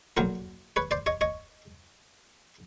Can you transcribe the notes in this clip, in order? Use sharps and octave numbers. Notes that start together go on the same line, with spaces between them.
B1 A#2 F#3 A#3 A#4 C5
B4 C#5
C5 D5
C#5 D#5
C#5 D#5